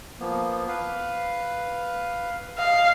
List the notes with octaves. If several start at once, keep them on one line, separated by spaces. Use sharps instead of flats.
F3 A#3 B3
B4 F5
D#5 F5